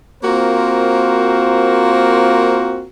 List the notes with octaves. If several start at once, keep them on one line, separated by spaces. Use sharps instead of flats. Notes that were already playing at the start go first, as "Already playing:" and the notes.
A#3 C4 F4 F#4 A#4 C5